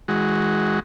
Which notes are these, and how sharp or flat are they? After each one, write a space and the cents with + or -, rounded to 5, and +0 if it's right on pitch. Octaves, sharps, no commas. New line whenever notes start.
E3 -35 G#3 +0 F#4 +0